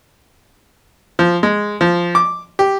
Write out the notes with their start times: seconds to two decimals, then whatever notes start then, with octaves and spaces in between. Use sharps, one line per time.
1.19 F3
1.43 G#3
1.81 F3
2.15 D6
2.59 G4